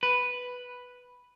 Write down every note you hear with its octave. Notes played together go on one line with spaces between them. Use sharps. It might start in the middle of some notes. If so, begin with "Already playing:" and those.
B4